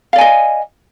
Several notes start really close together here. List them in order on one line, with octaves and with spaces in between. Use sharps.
F5 D5 G#5 D#5